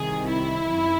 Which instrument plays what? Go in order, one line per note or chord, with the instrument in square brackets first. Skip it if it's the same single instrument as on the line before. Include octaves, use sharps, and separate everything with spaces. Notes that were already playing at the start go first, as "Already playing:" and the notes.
Already playing: [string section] C2 C3 D#3 G#4
E4
F#2 D#3